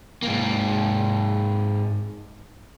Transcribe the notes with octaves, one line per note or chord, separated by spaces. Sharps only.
G#2 A#3